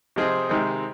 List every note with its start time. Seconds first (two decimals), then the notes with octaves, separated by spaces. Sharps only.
0.16 C3 F3 C4 D#4 G#4
0.49 C3 D#3 G#3 C4